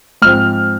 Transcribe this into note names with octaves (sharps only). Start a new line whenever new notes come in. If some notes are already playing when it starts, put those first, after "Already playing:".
G#2 F3 C4 F6